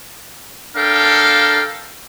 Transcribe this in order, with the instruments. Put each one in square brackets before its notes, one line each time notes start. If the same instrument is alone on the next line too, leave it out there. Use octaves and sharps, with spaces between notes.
[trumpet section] D4 A4 A#4 F5 G5